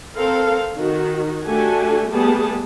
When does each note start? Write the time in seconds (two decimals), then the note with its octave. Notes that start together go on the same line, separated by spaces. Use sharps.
0.15 C4 A4 A#4 F5
0.76 D#3 F#4
1.45 A3 D4 F#4 G4 A4 G#5
2.08 G3 A3 B3 G4 G#4 A5